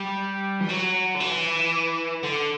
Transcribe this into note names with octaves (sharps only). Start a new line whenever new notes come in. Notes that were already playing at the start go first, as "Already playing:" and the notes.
Already playing: G3
E3
F#3
D3
E3
D3